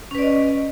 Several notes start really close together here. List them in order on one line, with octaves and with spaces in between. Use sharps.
C#4 B4 D5 D#5